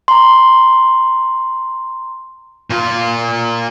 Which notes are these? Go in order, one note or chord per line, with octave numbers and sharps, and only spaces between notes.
A#5 C6
A#2 F4